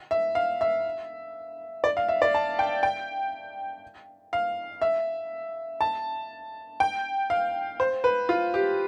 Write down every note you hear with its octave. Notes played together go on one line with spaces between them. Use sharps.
E5
F5
E5
D5
F5
E5
D5
A5
G5
G5
F5
E5
A5
G5
F5
C5
B4
F4
G4